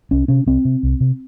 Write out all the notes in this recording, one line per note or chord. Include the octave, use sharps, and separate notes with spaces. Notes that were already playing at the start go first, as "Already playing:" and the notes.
C2 C#4
C3 C#4
C2 C4
C3
C2
C3